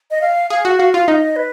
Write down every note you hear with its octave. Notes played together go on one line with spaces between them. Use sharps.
D#5
F5
G#4 F5
F#4 F#5
F#4 F5
F4 F5
D#4 D#5
B4